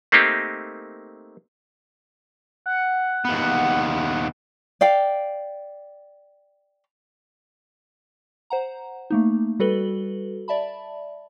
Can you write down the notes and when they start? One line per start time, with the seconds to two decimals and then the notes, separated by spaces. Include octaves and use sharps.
0.12 A3 A#3 C4 D#4 G4
2.66 F#5
3.25 D#2 B3
4.81 D5 F5 G5
8.50 C5 F#5 A#5
9.10 A3 A#3 D#4
9.59 G3 F#4 A4 B4 F#7 G7
10.48 D5 E5 A5 B5